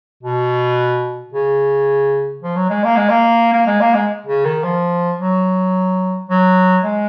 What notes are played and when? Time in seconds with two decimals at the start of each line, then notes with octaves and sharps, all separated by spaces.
0.23 B2
1.33 C#3
2.43 F3
2.56 F#3
2.70 G#3
2.84 A#3
2.96 G#3
3.10 A#3
3.53 A#3
3.67 G#3
3.81 A#3
3.94 G#3
4.26 C#3
4.45 D#3
4.63 F3
5.18 F#3
6.29 F#3
6.84 G#3